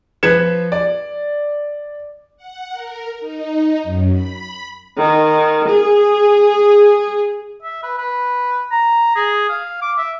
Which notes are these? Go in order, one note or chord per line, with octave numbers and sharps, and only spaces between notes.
F3 B4 G#6 C#7 E7
D5
F#5
A#4
D#4
F#2
B5
D#3
G#4
E5
B4
B4
A#5
G#4
F5
D6
E5